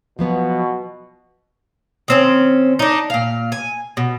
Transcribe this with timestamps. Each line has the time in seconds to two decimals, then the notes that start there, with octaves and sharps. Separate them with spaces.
0.19 B2 F3 F#3 B3
2.08 D#3 C4 C#4
2.79 D4 D#4
3.10 A#2 F5
3.52 G#5
3.97 B2